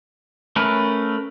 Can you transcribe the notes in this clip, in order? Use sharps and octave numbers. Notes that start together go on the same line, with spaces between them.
A3 C#4 A#4 B4